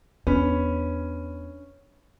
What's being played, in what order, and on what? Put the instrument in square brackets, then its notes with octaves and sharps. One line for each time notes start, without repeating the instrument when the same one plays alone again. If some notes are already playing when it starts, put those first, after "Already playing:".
[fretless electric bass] E2 B3 [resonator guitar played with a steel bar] C#4 [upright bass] D4 [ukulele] B4